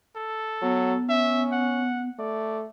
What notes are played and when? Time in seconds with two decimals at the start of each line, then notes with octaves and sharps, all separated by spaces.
0.16 A4
0.62 F#3 B3
1.09 C#4 E5
1.52 F#5
2.19 A3 D5